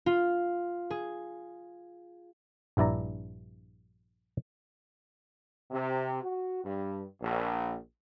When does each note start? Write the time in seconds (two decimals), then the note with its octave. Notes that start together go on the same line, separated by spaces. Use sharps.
0.06 F4
0.91 G#4
2.77 A#1 G2 E4 D5 A#5
5.71 C3
6.23 F#4
6.64 G2
7.21 A#1